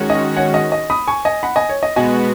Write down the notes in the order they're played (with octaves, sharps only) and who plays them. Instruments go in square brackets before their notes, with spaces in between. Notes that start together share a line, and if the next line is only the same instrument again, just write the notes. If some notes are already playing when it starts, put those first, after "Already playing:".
Already playing: [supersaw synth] D#3 G#3 C#4 F#4
[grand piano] D#5
C#5 F#5
D#5
D#5
B5 D#6
G#5 C#6
D#5 G#5
F#5 B5
D#5 G#5
C#5
D#5
[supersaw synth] B2 G#3 B3 F#4 [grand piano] D#5 G#5